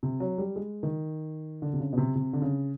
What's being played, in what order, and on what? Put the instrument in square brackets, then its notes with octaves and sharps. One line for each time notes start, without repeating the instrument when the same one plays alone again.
[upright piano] C3
F#3
G3
G#3
D#3
D3
C3
C#3
B2
C3
C3
D3
C#3